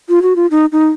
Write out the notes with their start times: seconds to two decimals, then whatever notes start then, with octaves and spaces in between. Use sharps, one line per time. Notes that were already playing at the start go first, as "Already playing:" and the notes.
0.09 F4
0.22 F#4
0.36 F4
0.51 D#4
0.72 D#4